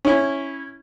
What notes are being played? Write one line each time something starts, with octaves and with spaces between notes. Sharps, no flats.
C#4 E4